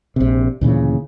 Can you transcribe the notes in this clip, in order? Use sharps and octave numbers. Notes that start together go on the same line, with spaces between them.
A#1 C3
D2 A#2 C#3 E3